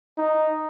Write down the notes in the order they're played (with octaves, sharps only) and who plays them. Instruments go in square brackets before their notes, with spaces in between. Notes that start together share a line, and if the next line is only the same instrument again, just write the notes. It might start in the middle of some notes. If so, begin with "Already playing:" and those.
[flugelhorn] D#4